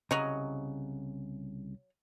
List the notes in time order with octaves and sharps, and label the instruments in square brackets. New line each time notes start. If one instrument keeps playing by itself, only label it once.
[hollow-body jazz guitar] C2 C#3 A#5 [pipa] F#3 C#5 D#5